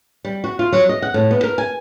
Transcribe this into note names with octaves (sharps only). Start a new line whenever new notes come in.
G3
F#4
F4
F#3
D#5
F#5
A2
B3
A#4
G#5